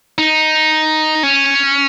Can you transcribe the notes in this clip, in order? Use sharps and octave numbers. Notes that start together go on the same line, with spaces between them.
D#4
C#4